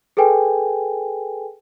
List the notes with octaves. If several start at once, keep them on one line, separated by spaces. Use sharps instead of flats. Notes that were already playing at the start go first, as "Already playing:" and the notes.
G#4 A4 B4 G5 G#5